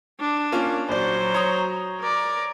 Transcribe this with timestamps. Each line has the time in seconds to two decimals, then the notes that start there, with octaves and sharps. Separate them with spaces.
0.20 D4
0.52 A#3 C#4 F4
0.89 A#1 F#3 C5 D5
1.34 C#5 A#5 D#6
2.00 A#4 D5